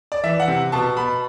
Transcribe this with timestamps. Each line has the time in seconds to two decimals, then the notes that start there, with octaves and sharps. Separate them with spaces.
0.12 D5
0.23 E3 E5
0.40 F#5
0.48 C3
0.72 B2 A5
0.97 B2 B5